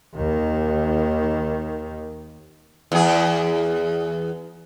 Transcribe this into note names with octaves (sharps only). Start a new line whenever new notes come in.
D#2 D#3
E2 G#4